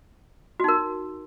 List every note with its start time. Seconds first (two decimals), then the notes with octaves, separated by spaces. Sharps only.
0.60 F#4
0.64 D#4
0.68 A#4